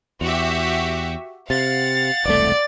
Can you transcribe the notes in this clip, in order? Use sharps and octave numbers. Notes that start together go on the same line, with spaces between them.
E2 F#4 G4 E5
C3 F5 F#5 A6
E1 C2 A3 D5